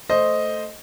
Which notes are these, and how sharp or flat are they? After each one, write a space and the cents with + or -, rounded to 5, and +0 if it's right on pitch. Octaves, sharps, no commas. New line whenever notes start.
A3 +0 C5 +0 D#5 +0